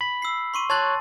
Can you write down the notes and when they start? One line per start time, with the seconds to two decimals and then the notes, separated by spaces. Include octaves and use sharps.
0.01 B5
0.22 E6 C7
0.54 C6 C#6 D#7
0.70 C#5 A5 C6 F#6 A6